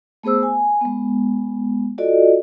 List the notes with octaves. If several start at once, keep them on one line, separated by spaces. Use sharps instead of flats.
A3 B3 G#4 C5 E6
G#5
G#3 B3
F4 F#4 A4 D5 D#5